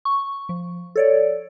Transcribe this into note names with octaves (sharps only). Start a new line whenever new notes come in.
C#6
F3
A4 C#5 D5